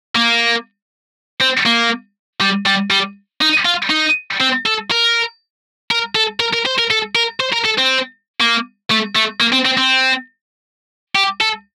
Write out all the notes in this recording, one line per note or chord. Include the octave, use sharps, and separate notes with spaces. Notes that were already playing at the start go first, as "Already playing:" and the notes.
A#3
C4
A#3
G3
G3
G3
D#4
F4
D#4
C4
A4
A#4
A#4
A4
A#4
A#4
C5
A#4
A4
A#4
C5
A#4
A4
C4
A#3
A3
A3
A#3
C4
C4
C4
G4
A4